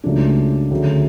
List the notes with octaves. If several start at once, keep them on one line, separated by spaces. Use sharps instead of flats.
C#2 C#3 F#3 A3 D4
D2 C#3 F#3 A3